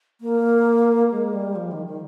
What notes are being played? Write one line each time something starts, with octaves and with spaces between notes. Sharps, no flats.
A#3
G#3
G3
F3
D#3
D#3